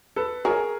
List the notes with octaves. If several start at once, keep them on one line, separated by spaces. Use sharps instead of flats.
A4 B4
F#3 G#4 A#4